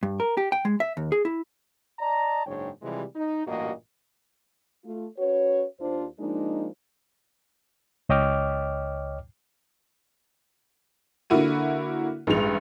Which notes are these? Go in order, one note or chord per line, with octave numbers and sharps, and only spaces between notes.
G2
A#4
G4
G5
G#3
E5
D#2
G#4
E4
D5 D#5 A5 A#5
F#1 G#2 D4 C#5 G5
C3 E3 F3 G3 G#3
D#4
A1 G2 A#2 A#3 F#4 D#5
A3 F4
C#4 F#4 B4 C#5
D#2 D4 F4 C5
F3 G#3 A#3 D4 D#4
C#2 C#5 D#5 G5 D6 F6
D3 A#3 E4 F#4 D#7
A1 G2 G#3 F7